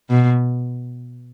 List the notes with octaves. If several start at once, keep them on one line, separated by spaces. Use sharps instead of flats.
B2